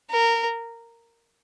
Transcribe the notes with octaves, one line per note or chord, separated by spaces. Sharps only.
A#4